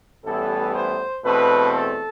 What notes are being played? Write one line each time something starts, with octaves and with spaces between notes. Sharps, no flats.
A1 A2 E3 G3 B3 A4
C5
E2 B2 A3 C4 B4
A4